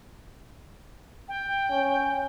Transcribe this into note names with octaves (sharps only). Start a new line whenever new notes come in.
G5
C#4